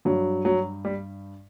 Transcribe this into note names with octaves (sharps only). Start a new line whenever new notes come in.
G2 F#3
F#3
G3